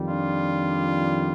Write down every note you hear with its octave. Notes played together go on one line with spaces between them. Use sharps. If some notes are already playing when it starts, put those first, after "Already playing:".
Already playing: F2 D#3 G3
D4 F4